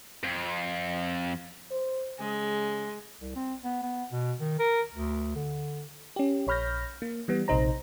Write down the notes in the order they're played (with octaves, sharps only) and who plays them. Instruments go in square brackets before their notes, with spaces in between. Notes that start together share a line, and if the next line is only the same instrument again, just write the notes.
[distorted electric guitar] F2
[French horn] C5
[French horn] C#3 [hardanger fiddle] G#3
[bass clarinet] C2
C4
B3
B3
B2
D#3
A#4
D2
D3
[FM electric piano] C#4 G4
A#1 C#5 B5 F6 G6 A#6
A#3
E3 G3 B3
A#1 C3 D#4 C5 A#5